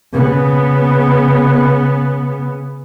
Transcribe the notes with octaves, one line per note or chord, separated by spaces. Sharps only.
C#3 B3